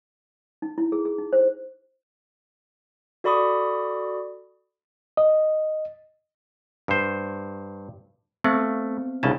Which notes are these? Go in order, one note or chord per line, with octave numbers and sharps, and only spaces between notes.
D#4
E4
G#4
G#4
D#4
C5
F#4 A4 D5 B5 C#6 D#6
D#5
G2 C5
A3 B3 C4 C5
C2 C#3 D4 A5